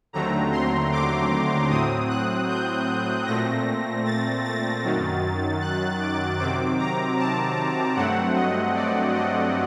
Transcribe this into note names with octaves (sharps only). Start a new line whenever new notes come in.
D#2 D3 F#3 A3 C4 A#5
C6
D6
A2 F#3 C4 D#6
F#6
G6
A#2 A3 C4 A#6
A6
A6
F#2 D#3 F#3
F#6
D6
C3 D#3 F#3 C4 D6
A#5
A5
G2 F#3 A3 C4 F#5
D#5
D5
D#5